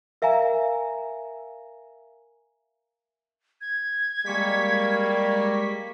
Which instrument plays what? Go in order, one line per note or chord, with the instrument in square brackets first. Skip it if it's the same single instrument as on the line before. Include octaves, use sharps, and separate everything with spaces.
[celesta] A#4 E5 F5 G#5 A#5
[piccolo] G#6
[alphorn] G3 [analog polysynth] G#3 C#6 B6 [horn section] A#3